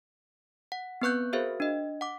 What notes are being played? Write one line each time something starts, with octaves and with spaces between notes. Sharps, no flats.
F#5
B3 C4 B4 C#6 F#6 G6
F#4 G#4 A#4 C5 E5 F5
D4 D#5
F#5 D6